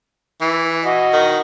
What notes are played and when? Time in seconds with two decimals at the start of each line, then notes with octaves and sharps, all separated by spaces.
0.41 E3
0.85 F#4 D#5
1.13 D#3